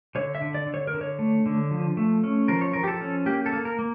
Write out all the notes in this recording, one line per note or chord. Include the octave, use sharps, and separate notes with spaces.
D3 C#5
E5
D3
D5
D3
C#5
A#4
D3
C#5
A3
D3
F3
A3
C#4
F3 A#4
C#5
F3 A#4
G4
A4
C#4
A#3 G4
A4
A#3
A#4
A#3